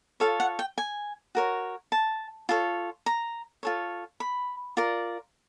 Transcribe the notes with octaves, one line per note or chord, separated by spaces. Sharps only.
F4 A4 C#5 F5
F#5
G5
G#5
F#4 A#4 C#5
A5
F4 A4 C#5
A#5
F4 A4 C#5
B5
F4 A#4 D5